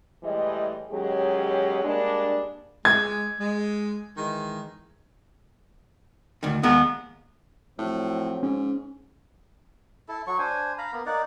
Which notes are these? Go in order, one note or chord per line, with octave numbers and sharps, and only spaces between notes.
A2 E3 G3 G#3 D#5
D#2 F#3 G#3 C#4 G4 G#4
G3 G#3 A#3 D4
G#3 G#6
G#3
D#3 E3 G#3
D2 D#3
D#2 G#3 B3 A#4
A2 F3 F#3 C4
G#2 C#4
E4 A4
F#3 C#6
D4 C5 G#5
F5 A#5 B5
A#3 B3
A#3 D#4 D5 F#5